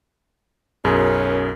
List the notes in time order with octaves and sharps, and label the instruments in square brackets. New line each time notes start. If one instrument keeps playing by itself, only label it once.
[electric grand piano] B1 F#2 G#4 [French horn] C#4 [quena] A#4